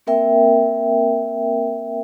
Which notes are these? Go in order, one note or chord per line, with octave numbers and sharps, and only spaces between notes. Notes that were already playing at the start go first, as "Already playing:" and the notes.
A#3 C4 A#4 E5 G5